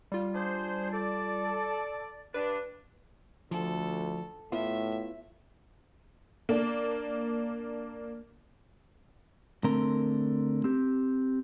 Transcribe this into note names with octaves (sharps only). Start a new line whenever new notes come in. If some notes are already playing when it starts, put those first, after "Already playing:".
G3 F4
D4 G#4 C5
A4 D5
G2 D4 B4
D2 F3 A4
A2 B3 E4 F4 E5
A#3 D4
D3 A3 C4 A#4 A#5 C6
C4 G4